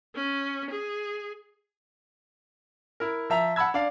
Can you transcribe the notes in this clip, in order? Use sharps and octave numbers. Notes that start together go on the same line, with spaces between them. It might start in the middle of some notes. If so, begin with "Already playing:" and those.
C#4
G#4
E4 A#4
F3 E5 A#5 F7
F#5 A5 B5 E6 G#6
D4 D5 F5